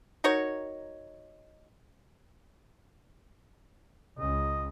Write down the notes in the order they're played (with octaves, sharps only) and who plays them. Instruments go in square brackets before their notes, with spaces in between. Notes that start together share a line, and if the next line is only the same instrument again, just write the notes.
[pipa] D#4 F#4 A#4 C#5
[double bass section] C#2 [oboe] D#5